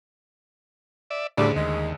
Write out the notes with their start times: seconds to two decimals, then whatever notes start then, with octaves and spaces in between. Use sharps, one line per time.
1.10 D5 E5
1.38 D2 A2 C#3 G3 D4
1.56 D#2 G#3